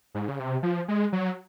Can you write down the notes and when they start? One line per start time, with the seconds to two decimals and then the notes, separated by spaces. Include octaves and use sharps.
0.15 G#2
0.29 C#3
0.40 C3
0.63 F3
0.88 G#3
1.13 F#3